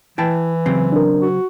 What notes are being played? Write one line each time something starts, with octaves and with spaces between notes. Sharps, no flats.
E3 E4 G5 A5
C#3 F#3 C4
D4 A#4
F#4